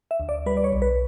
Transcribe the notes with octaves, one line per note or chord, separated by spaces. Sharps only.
E5
D2
D5
G3 B4
D5
C#5
B1
B4